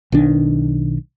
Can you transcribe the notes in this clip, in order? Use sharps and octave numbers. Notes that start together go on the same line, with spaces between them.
B1 D#3 D4